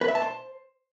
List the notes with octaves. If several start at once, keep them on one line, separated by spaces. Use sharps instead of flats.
B4
E5
A5
C5